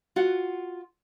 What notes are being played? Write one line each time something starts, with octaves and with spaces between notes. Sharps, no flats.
F4 F#4 F#5